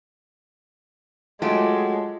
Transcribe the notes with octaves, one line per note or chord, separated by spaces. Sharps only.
F#3 G#3 A3 F4 G4